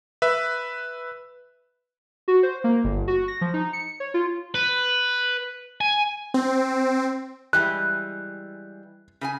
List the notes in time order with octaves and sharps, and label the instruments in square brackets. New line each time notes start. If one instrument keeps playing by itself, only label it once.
[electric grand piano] B4 E5
[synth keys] F#4
C5
A#3
G1
F#4
A#6
F3
D#4
C#7
C#5
F4
[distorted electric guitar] B4
G#5
[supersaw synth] C4
[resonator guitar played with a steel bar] E3 G3 G#3 [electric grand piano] F#6
[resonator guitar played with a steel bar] C#3 B4 G#5